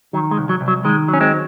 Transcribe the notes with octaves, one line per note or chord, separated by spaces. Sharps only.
D#3 F#3
G#3
C2
F#3
C2
F#3
D#3 G#3
F#3
C#4
G#3 C4